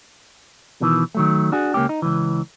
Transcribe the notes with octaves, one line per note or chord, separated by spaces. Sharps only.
B2 D#3 E3
D#3 F#3 A3
D4 F#4 G#4
C#2 A#3 C#4 G4
D#4
C#2 E3